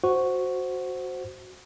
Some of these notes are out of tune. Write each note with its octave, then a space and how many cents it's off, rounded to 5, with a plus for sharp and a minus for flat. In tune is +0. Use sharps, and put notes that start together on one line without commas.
F#4 +0 C5 +0